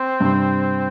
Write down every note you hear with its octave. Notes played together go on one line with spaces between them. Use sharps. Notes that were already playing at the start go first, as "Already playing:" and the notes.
Already playing: C4
G2 C3